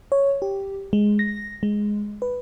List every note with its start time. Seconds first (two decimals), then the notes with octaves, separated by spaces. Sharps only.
0.12 C#5
0.42 G4
0.93 G#3
1.19 A#6
1.63 G#3
2.22 B4